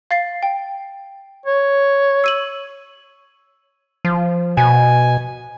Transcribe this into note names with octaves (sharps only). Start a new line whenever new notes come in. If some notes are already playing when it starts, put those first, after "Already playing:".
F5 A6 C7
G5
C#5
E6 D#7 F#7
F3
B2 G#5